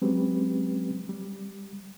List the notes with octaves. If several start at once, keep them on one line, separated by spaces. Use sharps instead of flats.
F#3 G#3 C4 C#4 G4 B4
G3